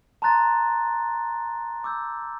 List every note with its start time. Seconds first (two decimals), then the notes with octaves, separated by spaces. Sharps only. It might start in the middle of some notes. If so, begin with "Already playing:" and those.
0.22 A5 A#5 C6 F#6 A6
1.84 D6 E6 G6